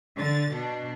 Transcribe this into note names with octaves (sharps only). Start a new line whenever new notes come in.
D3 A6
B2 D4